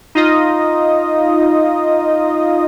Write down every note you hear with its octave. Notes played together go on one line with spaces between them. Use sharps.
D#4 F4 D#5